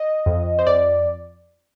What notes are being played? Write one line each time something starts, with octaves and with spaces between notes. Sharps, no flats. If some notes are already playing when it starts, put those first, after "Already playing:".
Already playing: D#5
F2
C5
F2 D5